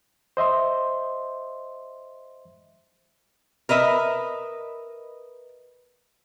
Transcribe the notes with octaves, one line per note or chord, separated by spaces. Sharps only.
C5 D#5 E5 C6
A#4 B4 D#5 E5